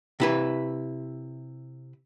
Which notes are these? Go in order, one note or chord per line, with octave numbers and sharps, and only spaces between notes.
C3 E4 B4